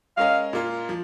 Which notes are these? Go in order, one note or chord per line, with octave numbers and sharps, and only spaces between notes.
G#3 C#4 A#4 D#5 F5
A#2 A#3 F4
F3